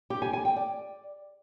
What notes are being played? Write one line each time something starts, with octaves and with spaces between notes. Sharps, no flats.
G4
G#5
G#5
G5
D5